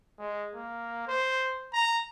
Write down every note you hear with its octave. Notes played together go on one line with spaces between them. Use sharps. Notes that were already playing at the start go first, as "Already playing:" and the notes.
G#3
A#3
C5
A#5